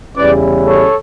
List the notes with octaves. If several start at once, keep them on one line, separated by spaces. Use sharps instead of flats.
E2 C#3 G3 C#4 E4 B4 D5
A4 C#5